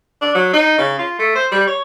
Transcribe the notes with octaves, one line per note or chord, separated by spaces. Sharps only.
D4
F#3
D#4
C#3
F4
A3
C5
G3
C#5